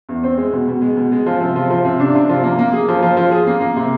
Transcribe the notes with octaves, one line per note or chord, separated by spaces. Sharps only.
E2
C4
G#3
B2
B2
G#3
B2
G#3
F3
C3
F3
F3
C3
D4
C3
F3
A#3
A#3
G#4
F3
F3
F3
G#4
A#3
A#3
C3